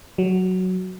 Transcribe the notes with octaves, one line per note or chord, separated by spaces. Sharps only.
F#3